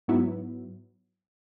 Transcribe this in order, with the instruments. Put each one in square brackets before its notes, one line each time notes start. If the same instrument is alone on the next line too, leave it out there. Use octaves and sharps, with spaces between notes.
[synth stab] G#2 F#3 B3 E4